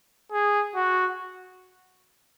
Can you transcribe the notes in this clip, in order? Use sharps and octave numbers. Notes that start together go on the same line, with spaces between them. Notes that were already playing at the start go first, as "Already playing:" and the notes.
G#4
F#4